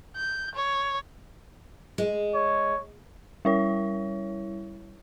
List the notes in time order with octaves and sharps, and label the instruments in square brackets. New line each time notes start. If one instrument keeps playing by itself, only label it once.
[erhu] G6
C#5
[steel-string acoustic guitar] G#3
[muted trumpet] C#5
[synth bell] G3 E4 C#5